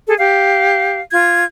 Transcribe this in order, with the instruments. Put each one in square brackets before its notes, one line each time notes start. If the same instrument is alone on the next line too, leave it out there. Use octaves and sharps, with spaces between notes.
[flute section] G#4 A4
G4 F5
F4 G#6